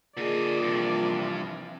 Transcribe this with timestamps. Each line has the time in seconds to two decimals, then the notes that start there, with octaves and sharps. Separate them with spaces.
0.17 A#2 D3 G#4 D5 D#5
0.62 G2 C3 E3 F3